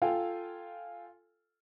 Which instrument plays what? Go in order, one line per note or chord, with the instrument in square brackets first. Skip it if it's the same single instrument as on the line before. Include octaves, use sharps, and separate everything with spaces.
[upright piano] F4 A4 F5 G5 G#5